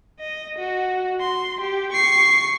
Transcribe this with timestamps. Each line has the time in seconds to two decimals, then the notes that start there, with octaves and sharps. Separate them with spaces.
0.20 D#5
0.59 F#4
1.20 C6
1.61 G4
1.93 C#6 C7